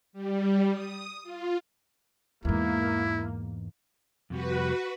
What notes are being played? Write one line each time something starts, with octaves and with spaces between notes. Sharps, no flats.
G3
D#6
F4
E2 G#2 A#3 E4
F2 C3 G3 F#4 B4